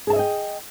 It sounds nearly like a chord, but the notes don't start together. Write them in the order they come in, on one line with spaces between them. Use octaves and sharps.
G#4 A5 E5 D#5 G5